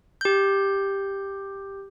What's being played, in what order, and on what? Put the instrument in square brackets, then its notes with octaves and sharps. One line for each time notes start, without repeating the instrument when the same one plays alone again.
[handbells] G4 G6